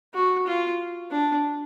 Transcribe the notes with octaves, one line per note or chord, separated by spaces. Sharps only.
F#4
F4
D4